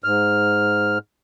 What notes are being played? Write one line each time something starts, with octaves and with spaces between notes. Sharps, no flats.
G#2 F6